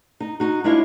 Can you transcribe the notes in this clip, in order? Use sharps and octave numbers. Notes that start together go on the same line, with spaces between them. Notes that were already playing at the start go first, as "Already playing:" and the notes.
D#4
D#4 F#4
G#3 D4 E4 F4 C#5